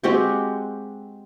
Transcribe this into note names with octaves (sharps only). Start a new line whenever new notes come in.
G#3 C4 F#4 G4